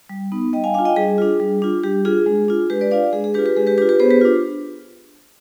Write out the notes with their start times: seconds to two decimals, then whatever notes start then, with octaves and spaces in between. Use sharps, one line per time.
0.09 G3
0.32 B3 D#4
0.53 G3 D#5 G5
0.64 F5 G#5
0.74 D4 F5 G#5
0.79 F4
0.85 D#5 G5
0.96 G3 G#4
1.18 D4 F4
1.40 G3
1.62 D4 F4
1.83 G3 G4
2.05 D4 F4 G#4
2.26 G#3
2.48 D4 F4
2.70 G#3 G4 B4
2.81 B4 D5
2.91 D4 F4 D5 F5
3.13 G#3 G#4
3.24 G#4
3.34 D4 F4 G4 B4
3.46 G4 B4
3.56 G#3 G#4
3.67 G4 B4
3.78 D4 G4 B4
3.82 F4
3.89 G4 B4
3.99 B3 G#4 C5
4.11 G4 B4
4.21 D4 F4